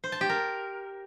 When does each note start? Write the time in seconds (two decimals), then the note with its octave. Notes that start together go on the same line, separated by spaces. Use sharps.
0.04 C5
0.12 A5
0.21 G4
0.29 A#4